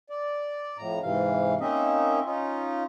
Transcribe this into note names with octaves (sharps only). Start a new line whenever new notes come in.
D5
F2 A2 A#5
G#2 C3 E3 F5
A#3 C4 C#4 D#4 D#5 E5
C#4 D#4 F4